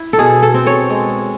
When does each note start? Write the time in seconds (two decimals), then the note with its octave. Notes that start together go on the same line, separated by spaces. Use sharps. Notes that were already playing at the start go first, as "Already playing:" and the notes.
Already playing: E4
0.13 A4
0.18 B2 G#4
0.43 A4
0.54 C4
0.67 C#5
0.90 G#3